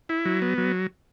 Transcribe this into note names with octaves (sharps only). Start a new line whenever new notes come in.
E4
F#3
B3
F#3